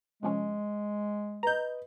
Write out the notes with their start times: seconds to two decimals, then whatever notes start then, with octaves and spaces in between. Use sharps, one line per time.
0.23 C3 F3 G#3 C#4
1.43 B4 D#5 A#5 G6